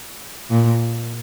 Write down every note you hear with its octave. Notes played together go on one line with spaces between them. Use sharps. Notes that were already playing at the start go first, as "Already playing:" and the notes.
A#2